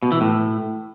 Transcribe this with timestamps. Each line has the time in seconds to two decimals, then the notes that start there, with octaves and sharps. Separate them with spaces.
0.03 B2
0.12 E3
0.21 A2